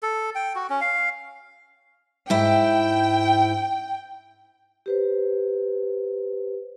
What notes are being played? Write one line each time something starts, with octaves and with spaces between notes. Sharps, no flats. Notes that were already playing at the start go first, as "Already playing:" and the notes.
A4
G5
F#4
C#4
F5
G#2 E4 G5
G4 B4 C5